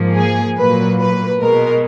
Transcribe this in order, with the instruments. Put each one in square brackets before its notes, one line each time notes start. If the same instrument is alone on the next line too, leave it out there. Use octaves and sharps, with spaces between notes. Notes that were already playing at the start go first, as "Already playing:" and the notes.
Already playing: [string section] G#2 F3 A#3
G#4
A#2 F#3 A#3 B4
B4
B2 G#3 A#4